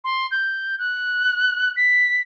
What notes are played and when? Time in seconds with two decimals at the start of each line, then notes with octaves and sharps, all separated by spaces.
0.04 C6
0.31 G6
0.79 F#6
1.76 B6